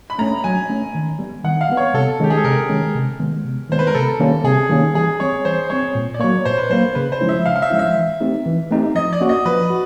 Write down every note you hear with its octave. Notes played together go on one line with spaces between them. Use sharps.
B5
A3 C#4 A#5
F#3 G#5
A3 C#4
D#3
G3 B3
D#3 F#5
F5
G3 B3
C#5
C3 A4
D#3 G#3 C#4 G4
G#4
A4
C3 A#4
D#3 G#3 C#4
C3
D#3 G#3 B3
C3
D#3 G#3 B3 C5
B4
A#4
C3 A4
D#3 G3 A#3 C#4
C3 G#4
D#3 G3 A#3 C#4
E3 G#4
G3 C4 C#5
E3 C5
G3 C4 C#5
A#2
D5
F#3 A#3 C#5
A#2 C5
B4
F#3 A#3 C5
C#3 B4
C5
F3 G#3 C#4 E4
E5
C#3 F5
F5
E5
F3 G#3 C#4 E4
E5
E3
A3 C4 D#4 G4
E3
A3 C4 D#4 G4
F3 D#5
D5
A#3 C#4 F#4
D#5
F3 B4
F#4